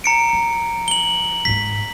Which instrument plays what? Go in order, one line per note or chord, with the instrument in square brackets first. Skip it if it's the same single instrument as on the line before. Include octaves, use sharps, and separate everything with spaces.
[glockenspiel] A#5 C#7 D7
[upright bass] F3
[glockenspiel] F#7 G7
[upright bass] G#2 G#3 [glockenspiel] B6